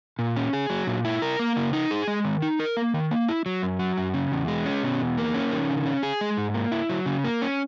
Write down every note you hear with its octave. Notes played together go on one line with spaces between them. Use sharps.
A#2
C#4
G#4
F#3
A#2
E4
A#4
A#3
C#3
D#4
G#4
G#3
D#3
D#4
A#4
A#3
D#3
A#3
E4
F#3
F#2
F#3
F#2
C#3
E2
G#3
C#4
B2
E2
A#3
C#4
D#3
C#3
C#4
G#4
G#3
G#2
A#3
E4
F#3
C#3
A#3
C#4